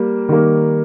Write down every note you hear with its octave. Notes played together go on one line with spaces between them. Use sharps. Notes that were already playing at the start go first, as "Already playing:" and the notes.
Already playing: G3 A#3
D#3 G3 A#3